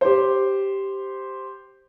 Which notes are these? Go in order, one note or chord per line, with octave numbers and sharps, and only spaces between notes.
G4 C5